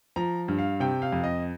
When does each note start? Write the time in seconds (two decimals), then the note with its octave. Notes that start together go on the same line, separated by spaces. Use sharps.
0.16 F3 A#5
0.48 G2
0.58 F5
0.80 C3 G5
1.02 F5
1.13 F2
1.24 D#5